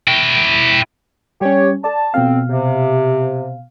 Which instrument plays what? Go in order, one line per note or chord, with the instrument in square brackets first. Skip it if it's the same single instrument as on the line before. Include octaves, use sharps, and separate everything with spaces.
[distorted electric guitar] E4 G5
[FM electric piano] G3 C#4 [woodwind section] G4 C#5
[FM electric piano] D5 [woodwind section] A5
[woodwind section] F2 C4 [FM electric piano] B2 F5
[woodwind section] C3